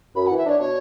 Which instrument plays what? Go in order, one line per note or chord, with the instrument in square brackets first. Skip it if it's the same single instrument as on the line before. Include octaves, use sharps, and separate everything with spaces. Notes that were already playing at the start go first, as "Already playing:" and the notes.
[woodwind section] F#2 [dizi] B5
[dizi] F#5
[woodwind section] E3
[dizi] E5
[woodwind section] D4 [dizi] C#5
[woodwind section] B2 [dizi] C#5